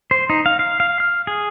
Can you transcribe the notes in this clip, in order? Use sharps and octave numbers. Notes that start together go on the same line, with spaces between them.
C5
D#4
F5
F5
F5
F6
G#4